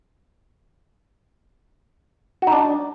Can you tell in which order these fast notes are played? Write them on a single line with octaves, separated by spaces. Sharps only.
F#4 D#4 D4